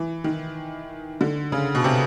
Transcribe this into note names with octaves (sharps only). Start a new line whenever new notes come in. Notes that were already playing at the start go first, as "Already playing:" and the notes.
Already playing: E3
D#3
D3
C#3
B2
C3